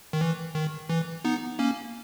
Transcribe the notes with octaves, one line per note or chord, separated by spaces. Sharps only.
D#3
E3
D#3
E3
B3 D#4
A#3 C#4